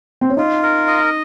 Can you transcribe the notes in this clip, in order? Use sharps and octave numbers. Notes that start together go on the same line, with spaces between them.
C4
C#4
D#4 F4
A#4
D#5